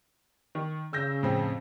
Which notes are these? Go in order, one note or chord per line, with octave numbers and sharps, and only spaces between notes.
D#3
C#3 E6 G6 A#6
F2 A2 C4